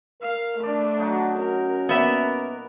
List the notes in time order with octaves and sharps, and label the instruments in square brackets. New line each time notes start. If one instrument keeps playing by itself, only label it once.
[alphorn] A#4 [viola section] F5
[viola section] A3 D4 [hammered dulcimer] D5 B5
[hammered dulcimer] F#3 D#4 F#4
[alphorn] C#4 [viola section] A#4
[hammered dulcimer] A#2 F#5 [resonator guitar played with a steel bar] B3 E5 [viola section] A#4